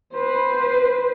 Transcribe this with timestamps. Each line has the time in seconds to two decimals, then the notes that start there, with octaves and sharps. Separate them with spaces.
0.14 B4 C5